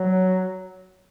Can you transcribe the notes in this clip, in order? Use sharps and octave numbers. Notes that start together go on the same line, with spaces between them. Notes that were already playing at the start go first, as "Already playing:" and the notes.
Already playing: F#3